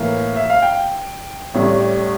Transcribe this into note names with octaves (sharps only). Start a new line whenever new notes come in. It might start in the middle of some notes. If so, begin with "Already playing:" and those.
Already playing: A2 E3 A#3 F5
E5
F5
G5
A1 A2 G3